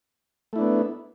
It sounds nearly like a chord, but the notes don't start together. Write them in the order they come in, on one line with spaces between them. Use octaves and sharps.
A3 E4 D4 B3